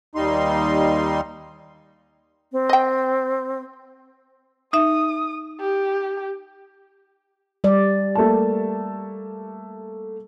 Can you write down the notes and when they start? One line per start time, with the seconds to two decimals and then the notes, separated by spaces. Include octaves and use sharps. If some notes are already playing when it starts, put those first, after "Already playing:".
0.15 D#2 G3 D#4 C6
2.52 C4
2.69 D#5 G5
4.73 D#4 E5 D#6
5.60 G4
7.64 G3 D5
8.15 A3 A#3 A5